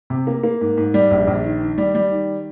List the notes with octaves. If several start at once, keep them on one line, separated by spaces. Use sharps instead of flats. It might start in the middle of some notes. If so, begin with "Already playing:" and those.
C3
A#3
A#3
G#2
G#2
G3
A#1
A#1
D#3
D#3
G3
G3
D#3